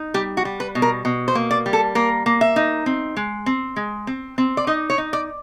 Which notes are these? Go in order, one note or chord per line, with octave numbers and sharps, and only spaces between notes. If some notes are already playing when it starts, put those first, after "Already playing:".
Already playing: D#4
G3 G4
F#4
G3
B4
B2
A#4
B2
C5
A#3
D5
G3
A4
A#3 A#4
A#3
E5
D#4
C4
G#3
C4
G#3
C4
C4
D5
D#4 D#5
C#5
D#4
D5